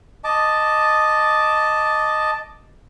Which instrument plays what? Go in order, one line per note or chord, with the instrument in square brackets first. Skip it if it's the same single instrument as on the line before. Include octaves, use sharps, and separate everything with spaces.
[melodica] D#5 A5 D6